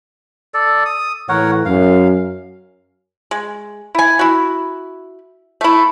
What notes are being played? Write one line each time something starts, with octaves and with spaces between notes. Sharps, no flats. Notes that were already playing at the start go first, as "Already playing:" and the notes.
A4 D5
D#6
A2 E3 A#4 C#5 F#5
F#2 F5
G#3
E4 G#5
E4 F#4
A3 E4